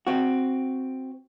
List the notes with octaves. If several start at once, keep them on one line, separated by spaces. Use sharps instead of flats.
C4 F#4